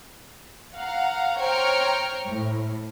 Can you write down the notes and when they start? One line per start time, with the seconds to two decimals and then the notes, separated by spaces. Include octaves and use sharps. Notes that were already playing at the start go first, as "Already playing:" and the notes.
0.75 F5 F#5 A#5
1.40 C5 C#5 G5 A#5 C#6 F6
2.27 A2